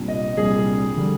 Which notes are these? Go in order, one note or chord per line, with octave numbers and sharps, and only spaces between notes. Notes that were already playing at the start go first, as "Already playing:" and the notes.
Already playing: C2 A#2 G3 D4
D#5
C2 A#2 G3 D4 G#4
D3 G3